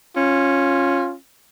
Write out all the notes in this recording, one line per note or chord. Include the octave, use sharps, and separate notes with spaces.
C#4 F4